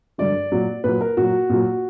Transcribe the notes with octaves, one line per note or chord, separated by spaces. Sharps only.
G2 D3 F#3 D5
A#2 F#3
A#2 F#3 B4
A#4
A#2 F#3 F#4
A#2 F#3